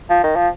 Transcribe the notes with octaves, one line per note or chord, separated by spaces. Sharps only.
F3
D#3
F3